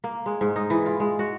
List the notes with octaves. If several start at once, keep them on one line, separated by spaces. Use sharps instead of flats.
A#3
G#3
G#2
D#4
E3
F4
G#3
F#4